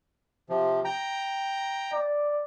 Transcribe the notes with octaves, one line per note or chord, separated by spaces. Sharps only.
C3 F3
G5 A#5
D5